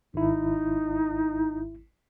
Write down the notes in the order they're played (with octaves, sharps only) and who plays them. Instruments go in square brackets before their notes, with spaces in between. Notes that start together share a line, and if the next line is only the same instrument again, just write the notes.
[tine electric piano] G#1 E4 [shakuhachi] D#4